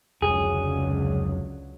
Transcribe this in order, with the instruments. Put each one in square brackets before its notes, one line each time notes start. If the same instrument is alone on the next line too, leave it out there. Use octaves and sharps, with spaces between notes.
[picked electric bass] F1 [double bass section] C#2 D3 F#3 [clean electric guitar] G#4